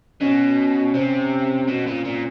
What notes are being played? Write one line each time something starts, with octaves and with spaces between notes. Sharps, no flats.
B2 C#4
C3 C4
B2
A#2
A#2